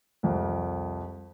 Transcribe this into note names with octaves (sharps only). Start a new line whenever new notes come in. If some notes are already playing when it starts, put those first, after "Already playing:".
C2 F2